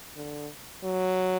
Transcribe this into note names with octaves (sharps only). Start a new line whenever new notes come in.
D3
F#3